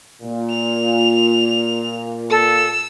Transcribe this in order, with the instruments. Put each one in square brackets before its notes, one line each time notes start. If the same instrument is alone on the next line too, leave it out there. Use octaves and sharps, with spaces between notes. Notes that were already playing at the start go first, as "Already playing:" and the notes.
[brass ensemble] A#2
[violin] F7
[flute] A4 [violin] E6